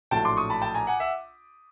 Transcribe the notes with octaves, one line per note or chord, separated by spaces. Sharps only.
A#1 A2 F#3 A3 D4 G5 A5
C6 D6
C#6 D#6
A5 B5
G5 A5
G#5 A#5
F#5 G#5
E5 F#5